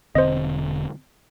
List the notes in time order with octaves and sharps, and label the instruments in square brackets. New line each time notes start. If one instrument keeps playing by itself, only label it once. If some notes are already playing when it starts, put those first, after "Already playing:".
[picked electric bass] E1 D3 C4 [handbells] C5 D#5